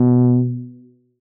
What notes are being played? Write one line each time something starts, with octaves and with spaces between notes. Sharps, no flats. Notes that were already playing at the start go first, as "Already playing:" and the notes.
Already playing: B2